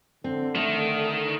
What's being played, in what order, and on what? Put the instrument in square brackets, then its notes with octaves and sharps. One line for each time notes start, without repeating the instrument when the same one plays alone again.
[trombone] D3 [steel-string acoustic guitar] C4
[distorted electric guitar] D#3 [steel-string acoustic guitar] A3